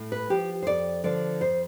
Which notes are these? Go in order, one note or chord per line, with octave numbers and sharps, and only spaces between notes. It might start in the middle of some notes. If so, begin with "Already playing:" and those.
Already playing: A2
B4
F3 G4
C5
F2 D5
D3 F3 D5
F2 C5